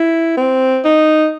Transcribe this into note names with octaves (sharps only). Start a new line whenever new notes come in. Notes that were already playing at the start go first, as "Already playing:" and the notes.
Already playing: E4
C4
D#4